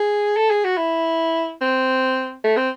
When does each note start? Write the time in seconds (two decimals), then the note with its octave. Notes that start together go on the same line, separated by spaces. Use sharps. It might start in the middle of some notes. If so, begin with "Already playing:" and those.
Already playing: G#4
0.37 A4
0.50 G#4
0.65 F#4
0.77 E4
1.61 C4
2.44 A3
2.57 C4